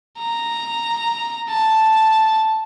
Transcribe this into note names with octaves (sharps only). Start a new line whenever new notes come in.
A#5
A5